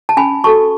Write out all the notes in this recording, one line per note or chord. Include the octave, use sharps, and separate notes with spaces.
A5
C#4 G#5 B5
F#4 A4 A5 C#6